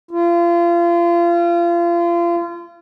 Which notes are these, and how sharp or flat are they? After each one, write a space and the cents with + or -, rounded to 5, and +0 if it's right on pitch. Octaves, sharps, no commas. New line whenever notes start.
F4 -30